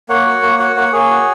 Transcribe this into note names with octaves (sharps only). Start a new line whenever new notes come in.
A#3 C#5 F#5
F#4
A#3
F#4 C#5 F#5
A#3 C#5 F#5
A#3 G#4 C#5
F#4